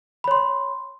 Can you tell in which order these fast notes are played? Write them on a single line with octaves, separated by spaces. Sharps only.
B5 C#5 C6